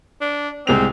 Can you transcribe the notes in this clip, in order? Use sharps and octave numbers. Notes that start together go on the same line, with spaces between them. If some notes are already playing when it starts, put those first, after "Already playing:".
D4
C2 G#3 C4 F7